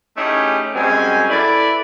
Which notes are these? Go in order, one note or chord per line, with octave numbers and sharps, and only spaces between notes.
A3 C#4 D#4 E4 G4 G#4
F#2 G3 G#3 C4 C#4 G#5
E4 A4 B4 D5